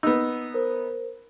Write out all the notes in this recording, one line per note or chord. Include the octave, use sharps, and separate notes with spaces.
B3 D#4 E6
A#4 C5